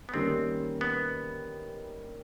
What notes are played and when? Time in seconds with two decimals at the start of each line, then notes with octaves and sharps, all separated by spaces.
0.09 B3
0.14 D#3 G3 A#3 C4 C#4
0.81 B3